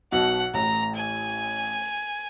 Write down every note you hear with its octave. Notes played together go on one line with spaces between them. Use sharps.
B1 B2 F#5
A1 A2 A#5
G#5